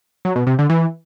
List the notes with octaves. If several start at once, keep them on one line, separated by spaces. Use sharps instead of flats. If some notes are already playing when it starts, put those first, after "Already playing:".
F#3
B2
C3
D3
E3